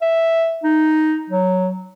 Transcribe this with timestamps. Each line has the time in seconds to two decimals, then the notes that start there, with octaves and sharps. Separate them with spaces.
0.02 E5
0.64 D#4
1.30 F#3